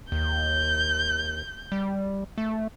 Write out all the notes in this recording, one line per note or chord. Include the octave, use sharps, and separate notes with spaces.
D#2 G6
G3
A3